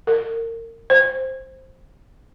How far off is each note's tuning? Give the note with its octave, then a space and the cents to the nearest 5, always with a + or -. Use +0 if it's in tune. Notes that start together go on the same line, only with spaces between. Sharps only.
A#4 -30
C5 +5